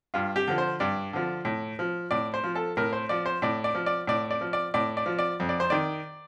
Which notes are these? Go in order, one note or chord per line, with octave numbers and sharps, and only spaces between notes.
G2 F4
G4
D3 F3
C5
G2 D5
D3 F3
A2
F3
A2 D5
C5
F3
A4
A2 A#4
C5
F3 D5
C5
A2 D5
D5
F3
D5
A2 D5
D5
F3
D5
A2 D5
D5
F3
D5
F2
D5
C5
D#3 D5